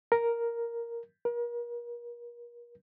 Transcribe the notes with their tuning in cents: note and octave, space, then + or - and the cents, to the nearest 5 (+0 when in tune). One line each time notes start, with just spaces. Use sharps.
A#4 +5
A#4 +40